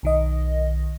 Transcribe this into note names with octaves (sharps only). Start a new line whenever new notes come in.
B1 D#3 D#5